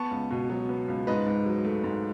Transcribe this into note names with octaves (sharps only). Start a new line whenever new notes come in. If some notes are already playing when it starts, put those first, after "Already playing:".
Already playing: B3 A5 C#6
C#2
B2
F#3
B3
C#2
G#2 B4 D#5
G#2
F#3
A3
G#2